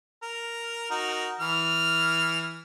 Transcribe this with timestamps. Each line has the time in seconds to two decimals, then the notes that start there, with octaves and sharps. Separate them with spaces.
0.23 A#4
0.91 D#4 F#4 A#4
1.40 E3 F6